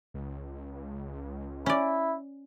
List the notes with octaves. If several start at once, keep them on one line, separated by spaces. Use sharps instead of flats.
C#2
C#4 E4 D5